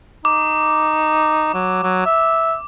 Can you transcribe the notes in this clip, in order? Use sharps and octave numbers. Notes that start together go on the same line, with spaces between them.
D#4 D6
F#3
F#3
E5